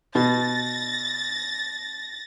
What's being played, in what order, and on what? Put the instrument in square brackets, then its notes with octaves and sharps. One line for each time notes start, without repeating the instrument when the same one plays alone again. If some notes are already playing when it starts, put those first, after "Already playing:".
[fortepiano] B2 [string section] A6 A#6